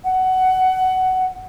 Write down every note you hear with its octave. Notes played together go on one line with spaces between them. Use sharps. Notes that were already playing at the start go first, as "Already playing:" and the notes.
F#5